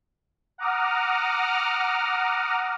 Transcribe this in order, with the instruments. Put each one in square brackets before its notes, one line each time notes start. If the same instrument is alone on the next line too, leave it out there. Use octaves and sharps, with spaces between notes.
[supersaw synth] F#5 A#5 D6 D#6 F6